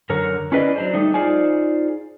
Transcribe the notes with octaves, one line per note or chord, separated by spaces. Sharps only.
F#2 D3 A#4 C#5
C#4 E4 G#4 B4 D5 D#5
F#3 D4 C5
G3 A3 D#4
D#4 F4 G#4 C5 D5 G#5